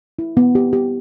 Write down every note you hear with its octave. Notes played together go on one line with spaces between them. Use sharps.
E4
B3
G4
G4